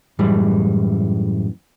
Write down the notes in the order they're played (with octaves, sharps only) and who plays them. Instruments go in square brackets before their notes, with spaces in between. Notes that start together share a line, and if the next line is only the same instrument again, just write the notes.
[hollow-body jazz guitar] F#2 A2 E3 G3 G#3